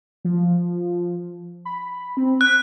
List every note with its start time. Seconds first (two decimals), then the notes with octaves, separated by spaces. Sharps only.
0.25 F3
1.65 B5
2.17 C4
2.41 F#6 B6